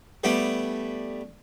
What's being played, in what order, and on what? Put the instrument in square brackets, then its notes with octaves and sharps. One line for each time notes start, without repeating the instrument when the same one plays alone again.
[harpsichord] G3 A3 B3 D4 E4 G4